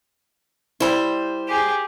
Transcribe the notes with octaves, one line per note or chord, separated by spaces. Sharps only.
G3 E4 C5 B5
G4 G#4